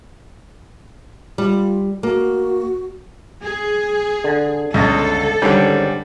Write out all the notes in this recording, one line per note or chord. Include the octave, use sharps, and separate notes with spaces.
G3 F4
A#3 F#4
G#4
D3
G1 C#2 A4 D#5
G#2 D3 D#3 G3 C#4